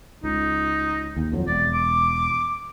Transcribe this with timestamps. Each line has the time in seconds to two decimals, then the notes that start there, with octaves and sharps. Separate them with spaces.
0.24 C#2 D#4
1.17 D#2
1.32 F2 F3 F#3
1.48 E1 D5
1.73 D6